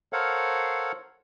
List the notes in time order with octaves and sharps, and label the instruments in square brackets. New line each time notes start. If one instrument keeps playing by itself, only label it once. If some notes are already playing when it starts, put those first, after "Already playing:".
[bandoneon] A4 A#4 C5 C#5 F5 F#5